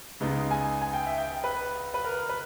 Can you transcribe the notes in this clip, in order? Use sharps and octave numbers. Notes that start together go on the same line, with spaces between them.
C#2 C#3 G#3 B3 D#4
G#5
G#5
G5
E5
G5
B4
B4
A#4
B4